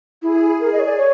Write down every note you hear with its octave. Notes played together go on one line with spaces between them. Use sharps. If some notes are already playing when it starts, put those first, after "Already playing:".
E4 G#4
G#4 A#4
D#5
C#5
D5
C#5